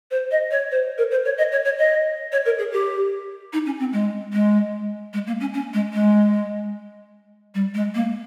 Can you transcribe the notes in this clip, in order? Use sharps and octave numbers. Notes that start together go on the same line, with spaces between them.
C5
D#5
C#5
C5
A#4
C5
C#5
D#5
C#5
C#5
D#5
C#5
A#4
G#4
G4
D#4
C#4
C4
G#3
G#3
G#3
A#3
C#4
C#4
G#3
G#3
G3
G#3
A#3